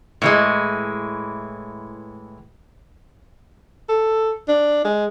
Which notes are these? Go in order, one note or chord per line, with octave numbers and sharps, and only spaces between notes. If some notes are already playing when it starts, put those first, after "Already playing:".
A2 E3 G#3
A4
D4
G#3